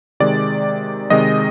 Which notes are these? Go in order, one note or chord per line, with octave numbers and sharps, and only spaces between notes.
C3 D#3 G#3 D5
C3 D#3 G#3 D#5